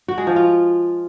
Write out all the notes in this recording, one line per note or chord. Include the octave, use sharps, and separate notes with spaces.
F#4
G#3
F3
F4